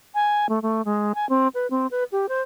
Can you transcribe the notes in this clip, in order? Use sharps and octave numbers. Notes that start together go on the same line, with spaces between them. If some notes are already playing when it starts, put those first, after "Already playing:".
G#5
A3
A3
G#3
G#5
C4
B4
C4
B4
G4
C5